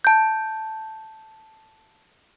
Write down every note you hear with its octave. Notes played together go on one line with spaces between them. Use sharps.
A5 G6